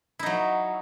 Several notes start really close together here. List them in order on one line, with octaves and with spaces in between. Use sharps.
E4 D#4 F#3